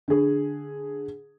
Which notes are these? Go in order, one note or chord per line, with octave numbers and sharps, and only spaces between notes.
D3 G#4